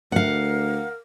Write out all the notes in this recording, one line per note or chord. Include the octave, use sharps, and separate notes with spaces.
D2 A#4 F5 F#5